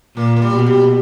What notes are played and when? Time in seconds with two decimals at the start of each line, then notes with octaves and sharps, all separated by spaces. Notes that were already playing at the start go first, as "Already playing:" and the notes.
0.16 A#2 A#3
0.36 A#3
0.42 G3
0.54 B2
0.66 G3